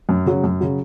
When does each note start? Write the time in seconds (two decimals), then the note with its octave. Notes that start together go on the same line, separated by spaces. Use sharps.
0.09 F#2
0.26 C#3 F#3
0.44 F#2
0.61 C#3 F#3